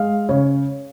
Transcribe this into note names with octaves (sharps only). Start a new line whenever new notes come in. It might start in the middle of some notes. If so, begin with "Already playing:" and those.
Already playing: G#3 F5
C#3 C#5